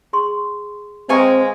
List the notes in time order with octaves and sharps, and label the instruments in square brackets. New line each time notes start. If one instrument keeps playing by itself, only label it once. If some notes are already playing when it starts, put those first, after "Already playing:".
[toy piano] G#4 C6 C#6
[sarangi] G#3 [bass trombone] C4 [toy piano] B4 A#5 [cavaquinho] F5 G#5 C#6